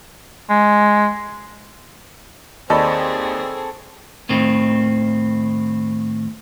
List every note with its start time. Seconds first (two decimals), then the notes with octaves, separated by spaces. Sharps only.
0.50 G#3
2.70 D#2 C4 G#4 A4 D5 D#5 B5 C#6
4.29 D#2 A2 D#3 C4